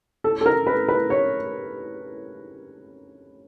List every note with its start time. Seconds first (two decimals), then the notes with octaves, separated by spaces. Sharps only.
0.24 A4
0.41 A4
0.46 A#4
0.67 B4
0.89 B4
1.10 C#5